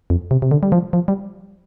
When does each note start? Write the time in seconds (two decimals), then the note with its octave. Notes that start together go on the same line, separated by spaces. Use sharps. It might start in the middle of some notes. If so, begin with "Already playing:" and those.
0.10 F2
0.31 C3
0.42 C3
0.51 D3
0.63 G3
0.72 F3
0.93 F3
1.08 G3